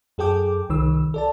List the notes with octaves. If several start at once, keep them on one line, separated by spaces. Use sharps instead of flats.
F#2 G#4 A4 G5 D6
C2 D#3 E6
A4 D5 A5